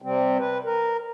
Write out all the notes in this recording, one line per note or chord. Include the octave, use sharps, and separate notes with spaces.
C3 G3 C4
B4
A#4